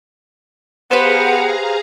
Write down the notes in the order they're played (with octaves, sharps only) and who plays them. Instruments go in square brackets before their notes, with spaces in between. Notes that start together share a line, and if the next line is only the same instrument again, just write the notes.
[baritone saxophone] B3 [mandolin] G4 B4 C5 [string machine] G#4 F5 A#5 [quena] F#5